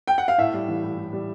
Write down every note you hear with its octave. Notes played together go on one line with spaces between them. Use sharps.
G5
F#5
F5
A2 E5
G3
E3
A2
A2
G3